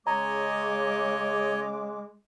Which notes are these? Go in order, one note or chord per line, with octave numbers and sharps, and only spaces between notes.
C#3 G#3 C#5 D#5 A#5 D6